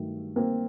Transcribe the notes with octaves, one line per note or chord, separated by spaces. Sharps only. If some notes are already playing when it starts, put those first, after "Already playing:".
Already playing: G2 D#3 F#3 A3
A#3 C4